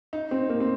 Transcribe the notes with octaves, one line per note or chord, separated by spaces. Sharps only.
D#4
C4
A#3
C4